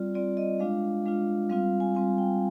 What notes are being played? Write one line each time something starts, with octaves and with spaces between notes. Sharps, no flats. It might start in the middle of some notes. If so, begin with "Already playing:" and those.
Already playing: G3 C4 F4 D5
G3 C4 F4 D5
D#5
G#3 D4 F4 F5
G#3 D4 F4
G3 C4 F4 F5
G#5
G3 C4 F4 G#5
G5